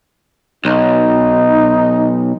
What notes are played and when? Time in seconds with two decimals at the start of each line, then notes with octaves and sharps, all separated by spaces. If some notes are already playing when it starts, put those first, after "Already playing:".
0.65 B1 D#4